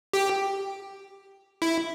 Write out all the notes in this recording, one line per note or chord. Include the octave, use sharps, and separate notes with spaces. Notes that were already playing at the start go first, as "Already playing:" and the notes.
G4
E4